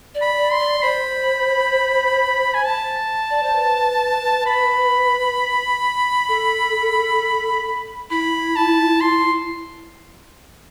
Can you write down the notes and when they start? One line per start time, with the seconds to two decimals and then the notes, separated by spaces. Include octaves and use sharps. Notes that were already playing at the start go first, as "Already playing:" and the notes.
0.15 D5
0.21 B5
0.37 D5
0.52 C6
0.60 D5
0.82 C5 B5
2.54 G#5
2.65 A5
3.30 D5
3.43 C5
3.55 B4
4.46 B5
6.29 A4
8.10 E4 B5
8.56 A5
9.01 C6